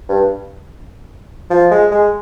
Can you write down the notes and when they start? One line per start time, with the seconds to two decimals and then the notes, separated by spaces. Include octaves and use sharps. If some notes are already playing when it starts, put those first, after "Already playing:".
0.09 G2
1.50 F3
1.71 G#3
1.92 G#3